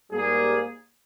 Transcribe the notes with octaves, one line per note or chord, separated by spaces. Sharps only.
G#2 G3 A#3 G#4